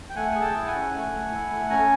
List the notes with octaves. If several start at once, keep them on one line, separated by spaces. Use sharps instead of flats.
G5
A3 F#5 G#5
G#4 G#5
G5 A5
E4
F#5 G#5
C#4
A3
A3
E4
A3
C#4 G#5 A#5